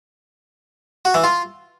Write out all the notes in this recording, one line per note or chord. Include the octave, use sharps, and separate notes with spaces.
F#4
E3
F4